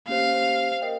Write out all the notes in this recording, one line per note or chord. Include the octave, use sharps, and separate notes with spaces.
A#3 C#4 G4 C5 F5
A#4 D#5 G5